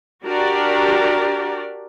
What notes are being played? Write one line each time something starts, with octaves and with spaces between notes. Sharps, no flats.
D4 F#4 G4 A#4 D5